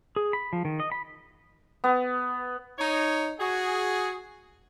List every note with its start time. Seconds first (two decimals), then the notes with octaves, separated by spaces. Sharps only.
0.16 G#4
0.33 B5
0.53 F3
0.65 D#3
0.80 D#5
0.92 B5
1.84 B3
2.79 D#4 C#5
3.40 F#4 G#4